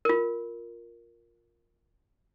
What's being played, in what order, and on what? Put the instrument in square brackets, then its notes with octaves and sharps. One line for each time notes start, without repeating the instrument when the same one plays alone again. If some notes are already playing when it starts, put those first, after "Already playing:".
[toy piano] F4 A#4